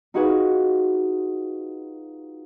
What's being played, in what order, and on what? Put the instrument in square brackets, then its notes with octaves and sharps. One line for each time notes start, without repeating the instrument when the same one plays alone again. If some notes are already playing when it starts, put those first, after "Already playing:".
[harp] D#4 F4 F#4 G#4 B4